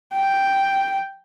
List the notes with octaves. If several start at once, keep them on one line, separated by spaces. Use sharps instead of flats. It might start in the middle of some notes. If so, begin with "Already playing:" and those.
G5